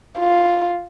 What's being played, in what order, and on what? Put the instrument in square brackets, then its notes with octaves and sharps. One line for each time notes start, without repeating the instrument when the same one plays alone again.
[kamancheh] F4